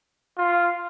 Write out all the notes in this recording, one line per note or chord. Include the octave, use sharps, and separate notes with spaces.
F4